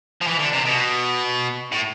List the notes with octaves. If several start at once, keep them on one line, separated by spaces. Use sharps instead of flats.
F3
E3
D3
C3
B2
A2